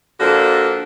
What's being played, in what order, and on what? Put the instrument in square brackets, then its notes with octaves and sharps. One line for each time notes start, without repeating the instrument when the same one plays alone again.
[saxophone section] D3 F3 A#3 D4 F#4 A4